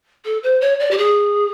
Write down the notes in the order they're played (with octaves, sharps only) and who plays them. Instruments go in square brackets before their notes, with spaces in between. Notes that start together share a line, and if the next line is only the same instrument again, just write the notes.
[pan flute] A4
C5
C#5
D5
G4
G#4